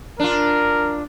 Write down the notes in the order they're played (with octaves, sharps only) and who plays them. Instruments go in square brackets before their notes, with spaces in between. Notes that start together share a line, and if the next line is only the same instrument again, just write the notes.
[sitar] D4 F4 [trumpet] A#4